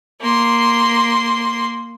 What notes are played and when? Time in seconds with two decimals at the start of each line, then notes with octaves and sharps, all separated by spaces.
0.21 A#3 C6